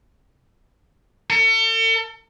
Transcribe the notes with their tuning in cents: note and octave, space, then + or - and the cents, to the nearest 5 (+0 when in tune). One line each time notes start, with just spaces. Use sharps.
A4 +40